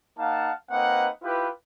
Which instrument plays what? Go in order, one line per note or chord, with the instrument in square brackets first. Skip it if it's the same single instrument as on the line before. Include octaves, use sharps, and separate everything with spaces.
[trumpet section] A#3 D#4 F5 F#5 A5
A#3 C4 D#4 B4 D#5 F#5
E4 F4 G4 B4